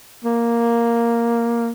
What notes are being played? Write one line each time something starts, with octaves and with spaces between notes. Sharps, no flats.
A#3